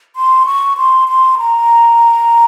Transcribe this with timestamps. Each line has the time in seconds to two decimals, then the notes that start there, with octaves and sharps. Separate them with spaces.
0.16 C6
0.46 C#6
0.77 C6
1.08 C6
1.38 A#5